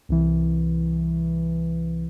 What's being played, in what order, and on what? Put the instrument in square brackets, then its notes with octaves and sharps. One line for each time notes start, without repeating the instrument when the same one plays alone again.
[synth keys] C2 E3